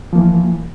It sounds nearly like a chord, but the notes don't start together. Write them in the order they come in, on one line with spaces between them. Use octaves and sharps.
F3 A#3 E3